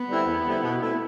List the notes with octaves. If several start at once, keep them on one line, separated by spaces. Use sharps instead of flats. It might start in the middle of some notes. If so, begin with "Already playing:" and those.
Already playing: B3
D3 G3 C4 E4
E2
D3 G3 C4 E4
B2
A3 C4 E4